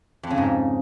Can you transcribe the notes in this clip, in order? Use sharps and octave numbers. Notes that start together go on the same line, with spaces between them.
F2
C#3
G#2